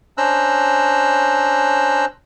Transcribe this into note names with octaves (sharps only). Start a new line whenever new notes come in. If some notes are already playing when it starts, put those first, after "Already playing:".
C#4 D4 C5 A#5 E6 F#6